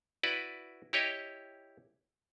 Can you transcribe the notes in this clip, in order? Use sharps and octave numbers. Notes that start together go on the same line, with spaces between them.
E4 F#4 B4 D5
E4 G4 C#5 D#5